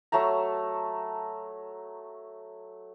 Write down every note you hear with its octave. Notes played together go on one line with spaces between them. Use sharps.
F#3 A3 A5 A#5